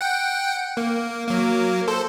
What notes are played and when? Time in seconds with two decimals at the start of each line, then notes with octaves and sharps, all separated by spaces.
0.01 F#5 G5
0.77 A#3
1.27 F#3 A#3
1.88 A4 C5